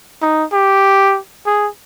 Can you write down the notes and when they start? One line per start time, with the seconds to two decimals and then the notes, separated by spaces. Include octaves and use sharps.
0.22 D#4
0.53 G4
1.46 G#4